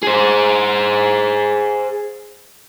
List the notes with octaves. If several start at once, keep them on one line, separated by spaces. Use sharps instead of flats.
G#4 C5